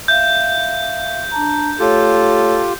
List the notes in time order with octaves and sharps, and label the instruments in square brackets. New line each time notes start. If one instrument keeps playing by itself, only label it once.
[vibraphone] E5 F5 [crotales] G6
[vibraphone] D4 A5 A#5
[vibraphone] A3 C#5 [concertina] F4 G4 [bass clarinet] A4